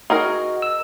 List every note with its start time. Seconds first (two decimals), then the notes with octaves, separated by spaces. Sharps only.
0.10 D#4 F#4 G#4 A#4
0.62 E6